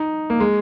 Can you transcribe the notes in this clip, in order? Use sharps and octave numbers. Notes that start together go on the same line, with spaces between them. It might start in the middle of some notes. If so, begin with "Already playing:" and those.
Already playing: D#4
A#3
G#3